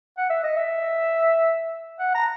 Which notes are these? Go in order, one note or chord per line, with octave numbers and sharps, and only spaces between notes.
F#5
E5
D#5
E5
F#5
A#5